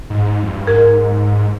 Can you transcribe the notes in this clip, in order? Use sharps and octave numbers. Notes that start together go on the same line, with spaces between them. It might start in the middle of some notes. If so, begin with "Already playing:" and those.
G#2
F2
G2
G#2 A#4